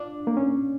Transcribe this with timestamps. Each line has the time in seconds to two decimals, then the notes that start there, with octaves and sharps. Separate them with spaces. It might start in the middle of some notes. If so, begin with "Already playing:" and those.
Already playing: D4 F4
0.27 A#3
0.37 C#4